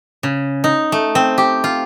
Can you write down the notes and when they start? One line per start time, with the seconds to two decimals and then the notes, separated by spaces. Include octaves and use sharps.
0.23 C#3
0.64 D#4
0.92 A3
1.15 C4
1.38 G4
1.64 F4